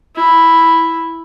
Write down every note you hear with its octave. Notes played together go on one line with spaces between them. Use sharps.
E4